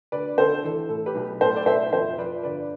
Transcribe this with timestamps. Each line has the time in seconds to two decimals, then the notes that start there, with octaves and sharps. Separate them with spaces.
0.12 D2 B4 D5
0.38 D2 A4 C5
0.64 E3 A4
0.89 A2 A4
1.06 G4 B4
1.15 B1
1.41 A2 A4 C5
1.56 D5
1.66 B1 C5 E5
1.92 F2 C5 E5
2.18 F3 B4 D5
2.43 G1 B4 D5